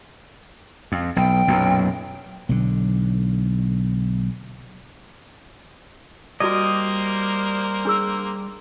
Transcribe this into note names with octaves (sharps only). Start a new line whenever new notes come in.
F2
B1 G5
B1 F#2 A#2
B1 D3
G3 A#3 F#4 A#4 C5 D5 D#5
D4 G#4 E6